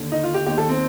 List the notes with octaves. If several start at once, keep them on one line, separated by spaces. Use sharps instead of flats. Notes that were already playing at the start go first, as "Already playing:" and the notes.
Already playing: D#2 D3
D#4
F4
G4
D#2 D#3 G4
A4
C4